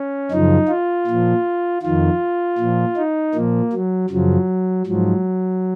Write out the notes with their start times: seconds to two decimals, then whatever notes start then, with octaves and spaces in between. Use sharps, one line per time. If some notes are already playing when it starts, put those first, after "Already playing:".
Already playing: C#4
0.32 F#2 C#3 F3 D#4
0.69 F4
1.07 A#2 F3
1.83 F2 D#3 F4
2.59 A#2 F3
2.97 D#4
3.34 A#2 F3 A#3
3.73 F#3
4.10 F#2 C#3 F3 F#3
4.87 G#2 F3 F#3